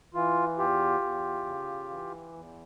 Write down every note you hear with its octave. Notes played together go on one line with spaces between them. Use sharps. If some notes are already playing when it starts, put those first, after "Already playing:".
E3 F4
E2 F4 G4
E2
C#3
E3
E2